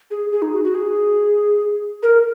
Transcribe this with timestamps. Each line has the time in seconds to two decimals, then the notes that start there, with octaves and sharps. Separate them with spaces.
0.11 G#4
0.32 G#4
0.42 D#4
0.53 F#4
0.64 F#4
0.75 G#4
2.03 A#4